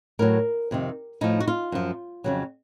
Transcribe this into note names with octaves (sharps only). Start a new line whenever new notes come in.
A2 F#3 A#4
F2 C3 D#3
A2 F3 D#4
F#4
F4
F#2 F3
F2 C#3 F#3